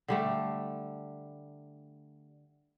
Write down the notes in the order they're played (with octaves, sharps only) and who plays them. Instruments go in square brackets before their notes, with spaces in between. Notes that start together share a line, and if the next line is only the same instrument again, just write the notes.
[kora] D3 G3 A3